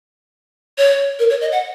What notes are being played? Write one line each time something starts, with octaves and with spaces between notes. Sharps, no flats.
C#5
A#4
C#5
D#5
F#5